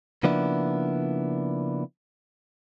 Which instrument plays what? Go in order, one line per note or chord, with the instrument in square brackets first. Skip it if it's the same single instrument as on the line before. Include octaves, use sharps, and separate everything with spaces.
[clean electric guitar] C#3 F3 A#3 B3 D4 E4